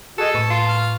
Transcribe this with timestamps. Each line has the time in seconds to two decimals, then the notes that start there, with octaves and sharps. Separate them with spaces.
0.18 F#4 G#4 A4 D#5
0.34 A2 B4 A5 C#6
0.51 F4
0.67 F6